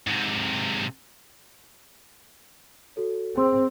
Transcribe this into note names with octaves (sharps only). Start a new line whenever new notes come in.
G#2 C3
F#4 A4 C#5
C4 G#4 C6 E6